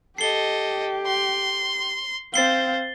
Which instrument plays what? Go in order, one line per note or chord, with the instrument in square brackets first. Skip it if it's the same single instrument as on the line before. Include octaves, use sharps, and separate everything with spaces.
[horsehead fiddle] G4 [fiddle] A4 D#5 [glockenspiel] C7 G7
[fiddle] C6
[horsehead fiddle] C4 F5 [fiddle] C5 [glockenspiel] A6 C7 G7